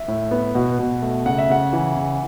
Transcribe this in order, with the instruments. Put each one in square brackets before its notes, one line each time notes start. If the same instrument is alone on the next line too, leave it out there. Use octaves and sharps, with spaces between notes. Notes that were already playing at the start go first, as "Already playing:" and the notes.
Already playing: [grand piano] E5
A2
B3
B2 F#5
B2
A3
C#3 F#5
E5
C#3 F#5
E3
C#3